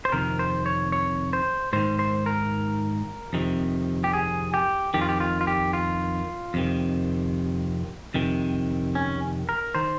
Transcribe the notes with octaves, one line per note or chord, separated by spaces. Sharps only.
C5
F2 C3 D#3 A#4
C5
C#5
C#5
C5
G#2 D#3 C5
C5
A#4
F2 C3 D#3
G4
G#4
G4
F2 D#3 G4
F4
G4
F4
F4
G4
F4
F2 C3 D#3
F2 C3 D#3
C#4
A#4
D#3 C5